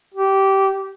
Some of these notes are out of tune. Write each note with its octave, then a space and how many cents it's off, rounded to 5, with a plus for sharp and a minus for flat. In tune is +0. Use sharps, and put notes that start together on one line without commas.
G4 -15